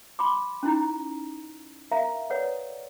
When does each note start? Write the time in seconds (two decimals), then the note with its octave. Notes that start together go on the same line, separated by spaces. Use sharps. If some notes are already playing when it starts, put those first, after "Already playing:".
0.19 B5 C6 D6
0.63 C#4 D#4 E4 A#5
1.91 A#4 E5 F5 A#5
2.30 A4 B4 C#5 D5 F#5